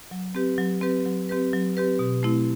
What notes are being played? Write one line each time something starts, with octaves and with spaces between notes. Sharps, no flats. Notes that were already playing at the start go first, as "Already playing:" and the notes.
F#3
C4 G4 B4
F#3
C4 G4 B4
F#3
C4 G4 B4
F#3
C4 G4 B4
B2
A3 C4 E4